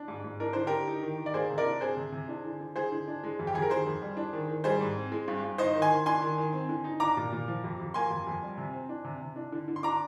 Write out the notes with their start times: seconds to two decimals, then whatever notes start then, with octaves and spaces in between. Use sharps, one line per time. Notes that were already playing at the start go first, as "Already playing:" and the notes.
Already playing: D4
0.08 G#2
0.24 G#2
0.40 D4 A#4
0.53 D3 C5
0.67 D3 G4 A#4
0.88 D#4
1.03 D#3
1.18 D#3
1.26 D5
1.34 A#3 G#4 C5
1.50 C3
1.58 A#4 D5
1.65 D4
1.81 C4 G#4 C5
1.97 C3
2.12 C3
2.28 D4
2.44 D3
2.60 D3
2.76 G#3 G#4 C5
2.92 D3
3.08 D4
3.24 G#3
3.39 F2
3.47 G4
3.54 F2 G#4
3.62 A#4
3.70 D#3 G#4 C5
3.86 F2
4.02 G3
4.17 D4
4.33 D#3
4.48 D#3
4.64 G3 G#4 C5
4.81 G#2
4.95 C4
5.12 G#3
5.28 G2
5.43 G2
5.58 D#4 C5 D#5
5.75 D#3
5.82 G#5 C6
5.91 D#3
6.06 D4 G#5 C6
6.22 D#3
6.38 D#3
6.53 C4
6.69 D3
6.84 D#4
7.00 D4 A#5 D6
7.17 A#2
7.33 A#2
7.48 F3
7.64 F2
7.80 F2
7.94 A#3 G#5 C6
8.10 F2
8.27 F2
8.42 G3
8.58 C3
8.73 C4
8.89 D4
9.04 C3
9.21 C3
9.36 D4
9.52 D3
9.68 D3
9.76 C6
9.83 D4 A#5 D6